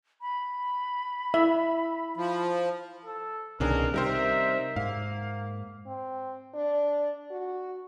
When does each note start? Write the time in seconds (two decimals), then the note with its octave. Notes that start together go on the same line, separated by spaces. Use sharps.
0.21 B5
1.34 E4 E5
2.17 F3
3.05 A4
3.60 C2 B2 D#3 C#4 D4 G#4 A#4
3.94 C3 G3 D#4 A#4 C5 E5
4.76 G#2 A#3 F5
5.87 C4
6.54 D4
7.31 F#4